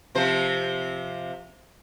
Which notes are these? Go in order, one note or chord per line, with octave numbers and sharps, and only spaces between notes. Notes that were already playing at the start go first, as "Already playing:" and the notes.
C3 F3 C5